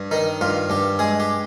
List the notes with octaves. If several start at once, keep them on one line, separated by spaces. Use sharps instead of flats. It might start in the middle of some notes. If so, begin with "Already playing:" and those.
Already playing: G2
D#3 D#4
G2 F4
G2 G4
G#3 G#4
G4